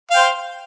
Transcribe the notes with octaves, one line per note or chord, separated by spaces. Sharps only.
C5 F5 G5